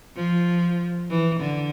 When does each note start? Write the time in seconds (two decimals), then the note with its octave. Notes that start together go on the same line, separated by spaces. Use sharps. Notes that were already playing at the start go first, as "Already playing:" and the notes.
0.17 F3
1.10 E3
1.41 D3